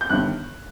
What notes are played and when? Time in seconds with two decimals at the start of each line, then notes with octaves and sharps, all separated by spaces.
0.01 G6
0.09 G1 G2 D#3 F#6